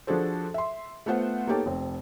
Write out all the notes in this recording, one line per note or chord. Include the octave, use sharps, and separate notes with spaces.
F3 D4 F#4 G#4 A4 C5
E5 C6
A3 B3 F4 C5 F#5
A#3 B3 D#4 G4 A4 C#5
F1 C4